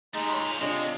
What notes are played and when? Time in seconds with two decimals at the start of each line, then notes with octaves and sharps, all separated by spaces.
0.14 G#3 A3 D#4 G4 D#5
0.30 C#5 C6
0.42 A#2 F4
0.61 C3 G#3 D4 F4 C#5 D#5